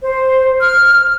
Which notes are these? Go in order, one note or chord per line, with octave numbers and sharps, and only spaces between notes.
C5
F6